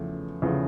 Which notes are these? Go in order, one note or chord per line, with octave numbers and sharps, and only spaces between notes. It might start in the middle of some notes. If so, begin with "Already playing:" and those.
Already playing: E2 C#3 F3 A3
E2 C#3 F3 A3